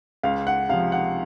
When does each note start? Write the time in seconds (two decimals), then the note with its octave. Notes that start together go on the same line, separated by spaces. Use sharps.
0.23 C#2 F5
0.47 F#5
0.69 C3 F5
0.73 F3
0.92 F#5